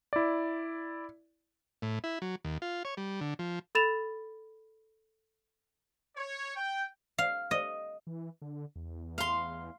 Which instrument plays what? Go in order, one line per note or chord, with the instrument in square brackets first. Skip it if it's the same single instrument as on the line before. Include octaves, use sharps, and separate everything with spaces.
[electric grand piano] E4 D5
[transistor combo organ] A2
E4
F#3
D#2
F4
C#5
G3
D3
F3
[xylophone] A4 B5 A6 E7 F7
[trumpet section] C#5
G5
[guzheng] F5
D#5
[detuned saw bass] E3
D3
E2
[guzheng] F5 C6